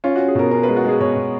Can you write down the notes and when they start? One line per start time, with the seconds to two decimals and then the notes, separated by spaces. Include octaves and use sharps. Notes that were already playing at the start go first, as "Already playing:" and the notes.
0.04 C#4 F4
0.16 C#4 F#4
0.28 G#4
0.35 B2 A#4
0.51 C#4 A#4
0.63 B4
0.68 G#3
0.77 F#4
0.85 G#3 G#4
1.00 B2 C#5
1.16 B2